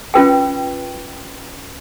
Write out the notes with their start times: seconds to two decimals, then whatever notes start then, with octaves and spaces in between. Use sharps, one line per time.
0.14 C#4 F4 B4 G5